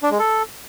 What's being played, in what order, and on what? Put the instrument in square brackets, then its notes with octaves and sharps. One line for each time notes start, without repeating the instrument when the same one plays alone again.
[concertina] D4
G#3
A4